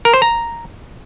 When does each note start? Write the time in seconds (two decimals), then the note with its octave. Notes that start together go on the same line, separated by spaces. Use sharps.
0.05 A#4
0.13 C5
0.22 A#5